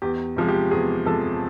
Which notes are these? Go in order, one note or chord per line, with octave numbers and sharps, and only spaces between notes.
E2 G4
C3 F3 G#3
G4
E2 G#4
C3 F3 G#3 A4